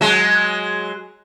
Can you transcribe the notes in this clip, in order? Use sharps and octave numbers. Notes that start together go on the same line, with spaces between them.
F#3 G#3